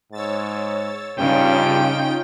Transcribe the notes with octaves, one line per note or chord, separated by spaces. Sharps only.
G#2 C#5 E6 A6
G2 C#3 C#4 D#4 F4 G5